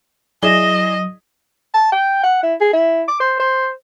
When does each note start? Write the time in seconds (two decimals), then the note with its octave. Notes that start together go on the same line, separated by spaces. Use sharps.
0.43 F#3 E4 G#4 D5 D#5 A#6 E7 G7
1.74 A5
1.92 G5
2.23 F#5
2.43 E4
2.61 G#4
2.73 E4
3.08 D6
3.20 C5
3.39 C5